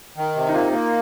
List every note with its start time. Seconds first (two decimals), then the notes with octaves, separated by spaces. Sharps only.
0.16 D#3
0.35 C3
0.49 D#4
0.54 A#3 F4
0.72 A#3